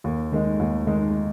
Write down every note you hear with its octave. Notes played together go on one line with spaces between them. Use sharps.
D#2
D#3 G#3 D#4
D#2
D#3 G#3 D#4